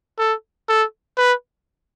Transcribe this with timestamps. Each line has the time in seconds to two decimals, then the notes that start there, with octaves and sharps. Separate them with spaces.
0.19 A4
0.69 A4
1.18 B4